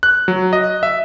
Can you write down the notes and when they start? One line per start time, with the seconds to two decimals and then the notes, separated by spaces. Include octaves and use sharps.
0.03 F#6
0.28 F#3
0.53 D#5
0.83 E5